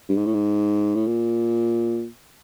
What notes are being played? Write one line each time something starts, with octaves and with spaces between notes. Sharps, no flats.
G2
G#2
A2
G#2
A2
A#2